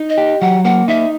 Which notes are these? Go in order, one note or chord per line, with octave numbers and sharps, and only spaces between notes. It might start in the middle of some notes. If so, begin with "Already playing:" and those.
Already playing: D#4
D#5
G4
F#3 F#5
A#3 F#5
D#4 E5